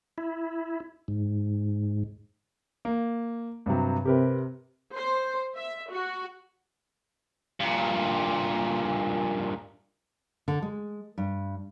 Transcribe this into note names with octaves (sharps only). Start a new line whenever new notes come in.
E4
G#2
A#3
G2 C3 F#3
C3 G4 A#4 B4
C5
E5
F#4
G2 A#2
D3
G#3
G2